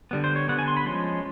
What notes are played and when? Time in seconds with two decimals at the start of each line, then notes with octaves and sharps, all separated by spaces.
0.11 D3 G3 B3
0.24 C5
0.36 C#5
0.48 D3 G3 B3 F#5
0.59 G#5
0.68 C6
0.77 B5
0.86 F3 G#3 C#4 C6